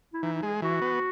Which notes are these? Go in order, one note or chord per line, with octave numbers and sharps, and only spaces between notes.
E4
E3 D#4
D#4
G#3 G#4
E3 F#4
B3